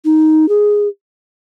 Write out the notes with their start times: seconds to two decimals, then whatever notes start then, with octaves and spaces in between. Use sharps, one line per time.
0.05 D#4
0.49 G#4